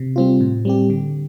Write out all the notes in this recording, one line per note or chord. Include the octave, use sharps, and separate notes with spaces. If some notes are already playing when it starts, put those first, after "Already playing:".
Already playing: C3
G3 C4 F4
A2
G3 C4 G4
D3